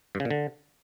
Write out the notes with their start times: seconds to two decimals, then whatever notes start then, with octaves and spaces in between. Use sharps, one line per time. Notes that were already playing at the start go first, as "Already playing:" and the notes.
0.15 G2
0.20 C#3
0.25 A#2
0.31 D3